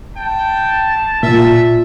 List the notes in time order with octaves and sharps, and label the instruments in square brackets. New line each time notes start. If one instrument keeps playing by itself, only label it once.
[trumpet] G5 [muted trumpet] A5
[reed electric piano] A#2 [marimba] F4 [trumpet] E5